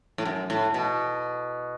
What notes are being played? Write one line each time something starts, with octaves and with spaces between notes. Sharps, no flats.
A2
F#2
A2
B2